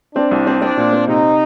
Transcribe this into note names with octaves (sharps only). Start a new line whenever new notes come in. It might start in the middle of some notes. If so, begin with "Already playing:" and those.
C4 D4
C2
C4
C4 D4
A#2
C4
C3 D#4